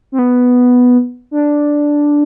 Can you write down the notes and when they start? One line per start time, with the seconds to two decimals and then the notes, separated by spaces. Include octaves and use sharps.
0.12 C4
0.19 B3
1.31 D4